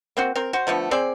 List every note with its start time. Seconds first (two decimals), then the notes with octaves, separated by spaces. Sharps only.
0.17 A#3 C4 F#4
0.35 C4 A#4
0.53 F#4 C5
0.67 D3 F3 A3 B3
0.91 C4 G#4 C5 D5